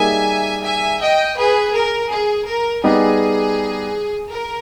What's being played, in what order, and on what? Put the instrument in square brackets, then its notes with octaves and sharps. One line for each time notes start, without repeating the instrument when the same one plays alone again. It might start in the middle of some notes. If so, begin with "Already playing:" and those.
Already playing: [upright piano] G3 A#3 D#4 G#4 [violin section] E5 G#5
[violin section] E5 G#5
D#5 G5
G#4 B4
A#4
G#4
A#4
[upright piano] G3 B3 D#4 G4 [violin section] G#4
[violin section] A#4